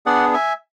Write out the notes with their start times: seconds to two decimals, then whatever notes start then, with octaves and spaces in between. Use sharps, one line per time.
0.06 B3 D4 G#4 D5 F#5
0.34 E5 G#5